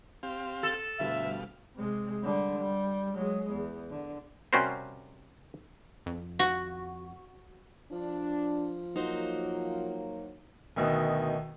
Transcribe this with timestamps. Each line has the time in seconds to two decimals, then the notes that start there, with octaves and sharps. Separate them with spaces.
0.23 C4 G4 F5
0.63 A4
1.00 D2 G2 B2 G3 E5 F5
1.76 C3 G#3
2.23 D3 G3
2.59 G3
3.14 F#3 G#3
3.51 E2
3.90 D3
4.53 C3 G3 C#4 F#4 A#4 C5
6.06 F2
6.39 F#4
7.92 F3 D4
8.96 F#3 A#3 D#4 F#4 C5
10.76 D2 B2 D#3